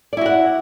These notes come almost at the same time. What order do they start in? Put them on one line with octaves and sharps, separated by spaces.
D5 E4 F#4 F#5